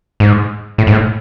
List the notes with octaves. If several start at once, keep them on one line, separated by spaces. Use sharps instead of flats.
G#2
A2
G#2
A2